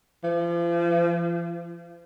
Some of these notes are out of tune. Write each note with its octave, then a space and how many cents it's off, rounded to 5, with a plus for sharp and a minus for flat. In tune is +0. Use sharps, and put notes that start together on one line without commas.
F3 -40